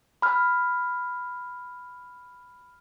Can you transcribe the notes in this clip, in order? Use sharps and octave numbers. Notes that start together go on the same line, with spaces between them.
B5 F6